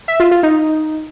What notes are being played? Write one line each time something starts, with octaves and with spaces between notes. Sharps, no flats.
E5
F4
F4
D#4